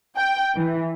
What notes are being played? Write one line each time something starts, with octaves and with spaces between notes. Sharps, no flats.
G5
E3